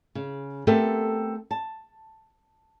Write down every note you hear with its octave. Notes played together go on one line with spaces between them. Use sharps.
C#3
A3 B3 C4 G4 A4 A#4
A5